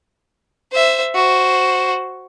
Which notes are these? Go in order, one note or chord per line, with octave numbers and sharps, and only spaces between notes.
C5 E5
F#4 C5